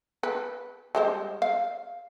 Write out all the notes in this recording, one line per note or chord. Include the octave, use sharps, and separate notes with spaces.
B4
G3 G#3 C5
F5